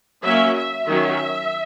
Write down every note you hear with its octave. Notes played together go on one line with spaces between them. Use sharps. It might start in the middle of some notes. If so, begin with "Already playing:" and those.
F#3 A#3 C#4 E5
E5
D#3 F#3 C#4